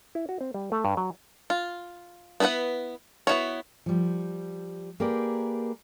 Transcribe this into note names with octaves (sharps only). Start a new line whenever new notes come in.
E4
F#4
C4
G3
A3
G2
F#3
F4
B3 E4 A4 B4 F#5
B3 E4 F#4 C#5
F3 G3
A#3 G4 G#4 A#4 B4 D5